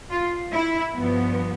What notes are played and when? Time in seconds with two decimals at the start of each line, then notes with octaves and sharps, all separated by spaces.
0.11 F4
0.53 E4
0.96 G2 F3 B3